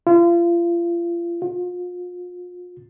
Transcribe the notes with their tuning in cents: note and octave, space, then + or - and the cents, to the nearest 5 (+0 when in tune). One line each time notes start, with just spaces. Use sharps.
F4 -35
F4 +35